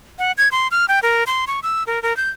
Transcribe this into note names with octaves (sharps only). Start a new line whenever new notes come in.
F#5
G#6
C6
F6
G5
A#4
C6
C#6
E6
A#4
A#4
G6